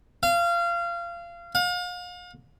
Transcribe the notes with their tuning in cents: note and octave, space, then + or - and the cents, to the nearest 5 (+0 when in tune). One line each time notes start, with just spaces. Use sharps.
F5 -25
F5 +40